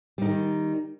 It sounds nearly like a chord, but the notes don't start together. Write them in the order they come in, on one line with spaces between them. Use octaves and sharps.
G3 D#4 D#3